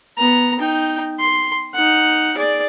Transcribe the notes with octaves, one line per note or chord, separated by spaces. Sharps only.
B3 A#5
D#4 G5
C6
D#4 F#5
G#4 D5